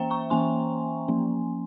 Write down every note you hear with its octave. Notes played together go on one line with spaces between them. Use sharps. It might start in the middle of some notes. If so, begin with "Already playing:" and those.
Already playing: E3 A#3 C#4 C5 E5 G5 A#5
A#5 C#6
E3 A#3 C#4 G#5 C6
F3 A#3 C#4